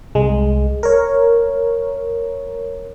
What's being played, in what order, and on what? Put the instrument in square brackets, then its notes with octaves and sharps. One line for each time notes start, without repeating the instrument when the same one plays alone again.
[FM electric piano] C2 G#3
A#4 C#5